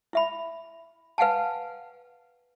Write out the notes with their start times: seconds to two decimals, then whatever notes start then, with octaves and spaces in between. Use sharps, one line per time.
0.13 E4 E5 B5
1.18 B4 F5 F#5 G#5 A5